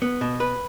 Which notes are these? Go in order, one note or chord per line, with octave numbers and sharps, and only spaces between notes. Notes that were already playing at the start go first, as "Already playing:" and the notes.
B3
B2
B4